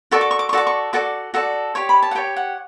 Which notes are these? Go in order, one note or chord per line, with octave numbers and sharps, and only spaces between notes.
F#4 A4 D5 C#6
D6
C#6
D6
C#6
F#4 A4 D5 D6
C#6
F#4 A4 D5 D6
F#4 A4 D5
G4 C#5 C#6
B5
A5
F#5
G4 C#5 G5
F#5